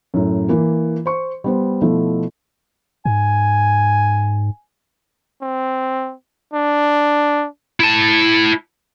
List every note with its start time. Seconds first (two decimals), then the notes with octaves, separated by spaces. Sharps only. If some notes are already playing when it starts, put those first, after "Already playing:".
0.14 F#2 A2
0.49 E3 A#3
1.06 C5 C#6
1.44 G3 B3 C5
1.81 B2 F3 A3 E4
3.06 G#2 G#5
5.42 C4
6.54 D4
7.80 E4 A5